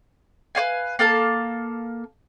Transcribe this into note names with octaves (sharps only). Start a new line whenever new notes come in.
B4 C#5 F5 G#5
A#3 A4 F5 A5